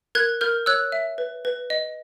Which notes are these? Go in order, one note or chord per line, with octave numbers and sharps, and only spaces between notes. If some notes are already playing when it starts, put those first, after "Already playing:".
A#4 F#6 G#6
A#4 F6 G6
C#5 E6 F#6
E5
B4
B4
D#5